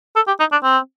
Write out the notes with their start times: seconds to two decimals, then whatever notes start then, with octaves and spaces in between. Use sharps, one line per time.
0.16 A4
0.27 G4
0.40 D#4
0.52 D4
0.63 C4